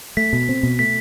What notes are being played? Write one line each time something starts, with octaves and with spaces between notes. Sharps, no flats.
A3 B6
B2
C4
B2
A3 B6